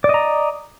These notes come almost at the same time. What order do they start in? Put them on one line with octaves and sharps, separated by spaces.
D5 D#5 A#5